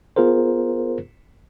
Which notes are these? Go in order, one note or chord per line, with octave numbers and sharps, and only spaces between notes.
B3 F4 G#4 A#4 C5